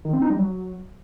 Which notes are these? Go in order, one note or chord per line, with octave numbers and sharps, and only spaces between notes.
D#3
C4
D#4
G3
F#3